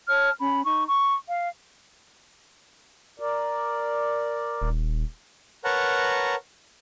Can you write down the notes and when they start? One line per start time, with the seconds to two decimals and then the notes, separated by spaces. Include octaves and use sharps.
0.08 C#5 A5 F6
0.38 C#4 B5
0.63 D#4 C#6
0.86 C#6
1.26 F5
3.20 A#4 D5
4.62 D#1
5.64 A#4 B4 C#5 F#5 A5 A#5